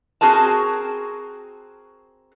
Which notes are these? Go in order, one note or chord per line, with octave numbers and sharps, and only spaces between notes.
C4 F#4 G#4 A#4 A5